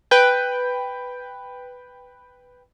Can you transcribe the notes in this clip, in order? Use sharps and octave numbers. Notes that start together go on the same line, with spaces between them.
B4 G5